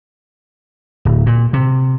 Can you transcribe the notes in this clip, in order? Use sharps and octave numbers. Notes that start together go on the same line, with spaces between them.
D1
A#2
C3